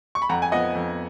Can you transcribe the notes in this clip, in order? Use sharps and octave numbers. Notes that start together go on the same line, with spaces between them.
C#6
B5
F2 F#5 A#5
G#5
F3 B3 D#5 F#5
F2